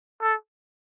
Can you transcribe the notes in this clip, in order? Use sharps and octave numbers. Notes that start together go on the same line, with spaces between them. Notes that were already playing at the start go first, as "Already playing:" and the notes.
A4